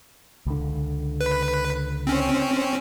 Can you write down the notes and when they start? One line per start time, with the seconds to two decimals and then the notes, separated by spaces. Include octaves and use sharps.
0.46 C#2 D3
1.21 B4
2.07 C4 C#4